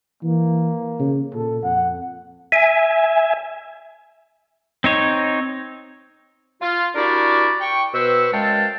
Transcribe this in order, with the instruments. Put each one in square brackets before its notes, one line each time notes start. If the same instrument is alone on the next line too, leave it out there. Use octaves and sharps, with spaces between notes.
[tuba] E3 [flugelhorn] A#3
[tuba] C#3
[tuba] A#2 [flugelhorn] A4
[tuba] F2 [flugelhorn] F#5
[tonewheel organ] E5 G#5
[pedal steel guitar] C4 D#4 C#5
[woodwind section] F4
D4 E4 F#4 G4 A#4 D5
G5 C#6
B2 B4 C5 C#6 E6
F#2 G#3 F5 G5 A5